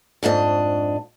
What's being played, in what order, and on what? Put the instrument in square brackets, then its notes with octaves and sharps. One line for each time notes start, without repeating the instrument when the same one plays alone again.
[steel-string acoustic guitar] F2 G#2 D4 D#5